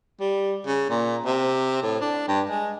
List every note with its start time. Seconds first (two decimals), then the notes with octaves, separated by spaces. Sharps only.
0.21 G3
0.67 C#3
0.90 A#2
1.26 C3
1.83 A2
2.01 D4
2.28 G2
2.49 G#3